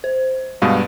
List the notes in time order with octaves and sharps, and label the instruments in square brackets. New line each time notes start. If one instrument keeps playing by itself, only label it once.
[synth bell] C5
[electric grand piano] G2 B2 G#3 [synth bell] F5